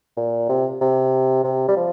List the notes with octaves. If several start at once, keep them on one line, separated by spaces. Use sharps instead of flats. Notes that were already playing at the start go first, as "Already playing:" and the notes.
A#2
C3
C3
C3
G3
F3